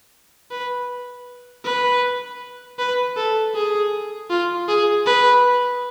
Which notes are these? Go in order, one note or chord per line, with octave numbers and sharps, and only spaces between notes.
B4
B4
B4
A4
G#4
F4
G#4
B4